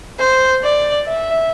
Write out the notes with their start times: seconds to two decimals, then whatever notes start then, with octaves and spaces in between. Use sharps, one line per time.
0.19 C5
0.63 D5
1.07 E5